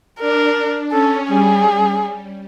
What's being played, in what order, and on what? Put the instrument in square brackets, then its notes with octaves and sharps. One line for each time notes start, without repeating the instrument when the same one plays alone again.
[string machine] D4 [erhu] A#4
[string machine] C#4 [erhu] A4
[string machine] G3 [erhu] G#4